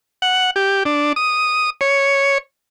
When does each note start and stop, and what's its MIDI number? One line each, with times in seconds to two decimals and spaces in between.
0.22 0.51 78
0.56 0.83 67
0.85 1.13 62
1.16 1.70 87
1.81 2.38 73